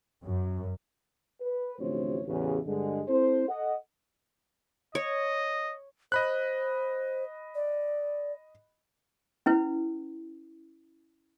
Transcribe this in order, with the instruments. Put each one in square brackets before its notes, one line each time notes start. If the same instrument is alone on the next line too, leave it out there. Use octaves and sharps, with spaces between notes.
[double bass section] F#2
[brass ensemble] B4
A1 D2 C3 F3 C4 C#5
A1 E2 C#3
G2 D3 G#3
C4 E4 A4 C5
A4 D#5 F#5
[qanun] C#5 [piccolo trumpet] D#5
[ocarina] C5 [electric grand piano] D#5 B5 F#6
[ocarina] D5
[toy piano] C#4 E4 B4